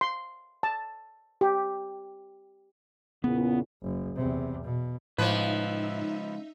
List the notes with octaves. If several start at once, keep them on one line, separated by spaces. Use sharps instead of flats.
C6
A5
G4
E2 A#2 C#3 B3
F#1
E2 C3
B2
C#2 A2 F3 B3 D#4 B4 E5